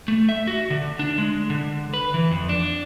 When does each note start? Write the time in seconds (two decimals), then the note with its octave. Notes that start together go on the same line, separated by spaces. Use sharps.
0.08 A3
0.29 E5
0.47 F#4
0.70 D3
0.99 D4
1.18 G#3
1.50 D3
1.94 B4
2.14 E3
2.31 F2
2.49 D4